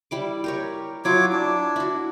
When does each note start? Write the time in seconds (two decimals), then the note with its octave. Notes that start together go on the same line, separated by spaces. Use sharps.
0.11 G3 E4 D6
0.44 G4 A#4 C#5
1.05 F#3 E4 F4 C#5 D6
1.32 D4
1.76 E4 F#4